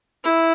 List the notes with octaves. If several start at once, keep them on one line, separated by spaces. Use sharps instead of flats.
E4